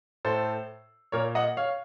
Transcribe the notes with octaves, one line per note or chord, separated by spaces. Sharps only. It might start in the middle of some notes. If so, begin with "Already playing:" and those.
A2 A4 C5
A#2 A#4 C#5
D#5 F#5
C#5 F5